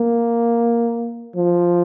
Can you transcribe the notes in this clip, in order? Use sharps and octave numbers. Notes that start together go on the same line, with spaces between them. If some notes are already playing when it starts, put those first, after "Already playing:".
Already playing: A#3
F3